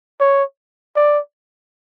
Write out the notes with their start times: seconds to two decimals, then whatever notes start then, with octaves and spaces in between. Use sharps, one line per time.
0.20 C#5
0.96 D5